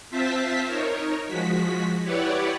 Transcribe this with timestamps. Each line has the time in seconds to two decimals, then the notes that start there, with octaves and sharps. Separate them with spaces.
0.11 C4 F4 C5 E5 A5 B6
0.66 D#4 A#4 C#5
1.27 F3 G#3 F#4 B6
2.03 E4 G4 B4 C#5 D5 F#5